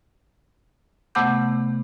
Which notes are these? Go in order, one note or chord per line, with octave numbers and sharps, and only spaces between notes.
C3 A3 B3 F#5 D6 G6